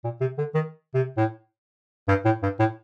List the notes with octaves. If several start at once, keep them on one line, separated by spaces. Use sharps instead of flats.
A#2
C3
D3
D#3
C3
A2
G2
A2
G2
A2